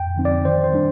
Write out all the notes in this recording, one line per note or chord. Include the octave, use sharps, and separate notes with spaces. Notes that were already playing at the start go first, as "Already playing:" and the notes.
Already playing: F2 G5
D3 F3 C4 D#4
D5
D#3 C5
C5
G3 D4